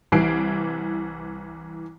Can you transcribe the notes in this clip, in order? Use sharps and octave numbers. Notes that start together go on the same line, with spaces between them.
C2 E3 C7 D7